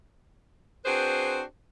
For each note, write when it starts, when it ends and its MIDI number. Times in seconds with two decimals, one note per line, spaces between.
0.85 1.41 60
0.85 1.41 62
0.85 1.41 66
0.85 1.41 68
0.85 1.41 71
0.85 1.41 72